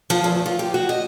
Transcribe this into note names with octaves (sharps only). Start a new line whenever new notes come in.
F3
E2
F4
G4
F#4
D#5